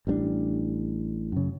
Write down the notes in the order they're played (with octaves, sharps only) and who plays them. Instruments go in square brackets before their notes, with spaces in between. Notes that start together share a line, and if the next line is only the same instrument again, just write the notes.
[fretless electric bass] A1 G3 A3 D4
F#2 C#3